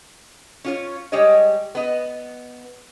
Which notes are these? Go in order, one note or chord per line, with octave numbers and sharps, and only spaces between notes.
C#4 F4 C#5
G3 G#3 G4 C#5 D#5
B3 D#5